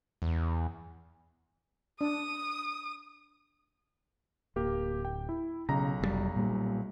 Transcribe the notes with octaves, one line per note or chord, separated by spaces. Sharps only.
E2
D4 D#6
D1 A#3 G4
G5
E4
B1 C#3 A#5 A#6
F1 B2 G3
A#2 G3